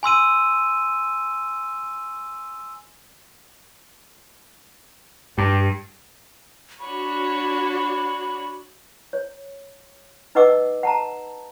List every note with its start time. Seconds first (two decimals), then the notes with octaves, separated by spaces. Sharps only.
0.03 G#5 C6 E6 D#7
5.38 G2 G4
6.81 D4 F#4 C#5 B5
9.13 C#5
10.35 D#4 B4 D#5 F#5 D6 E6
10.83 F#5 A5 A#5